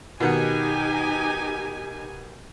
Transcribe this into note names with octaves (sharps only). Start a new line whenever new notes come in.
B2 D#3 D#4 G4 F#5 G#5